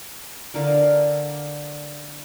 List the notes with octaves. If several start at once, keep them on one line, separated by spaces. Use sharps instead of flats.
D3 A#4 D5 F5